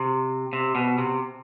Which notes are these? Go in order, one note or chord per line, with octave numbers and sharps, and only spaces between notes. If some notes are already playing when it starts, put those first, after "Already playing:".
Already playing: C3
C3
B2
C3